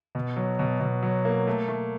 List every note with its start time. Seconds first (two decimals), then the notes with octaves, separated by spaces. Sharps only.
0.15 B2
0.36 F#3
0.59 B2
0.80 B2
1.03 F#3
1.25 A#3
1.47 A3
1.68 A3